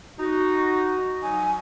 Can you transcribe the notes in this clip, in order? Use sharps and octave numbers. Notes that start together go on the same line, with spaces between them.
D#4 F#4
F#3 D#4 G#5